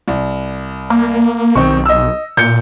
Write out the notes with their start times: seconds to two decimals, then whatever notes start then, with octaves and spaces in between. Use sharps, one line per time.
0.08 C2
0.90 A#3
1.55 B1 D#3 C4 C#6
1.86 D#5 E6
2.37 A#2 G6 C#7